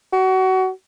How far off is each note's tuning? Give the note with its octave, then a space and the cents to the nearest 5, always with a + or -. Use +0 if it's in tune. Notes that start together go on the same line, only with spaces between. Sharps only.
F#4 +25